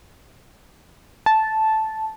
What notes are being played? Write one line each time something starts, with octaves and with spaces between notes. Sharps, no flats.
A5